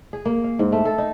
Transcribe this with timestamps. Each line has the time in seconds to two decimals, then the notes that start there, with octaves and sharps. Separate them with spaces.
0.13 G#4
0.25 A#3
0.44 F5
0.59 G#2
0.72 A3
0.85 A4
0.98 D#4